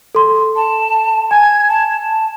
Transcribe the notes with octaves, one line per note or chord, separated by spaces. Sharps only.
A4 C6
A5
G#5 G#6
A5
A5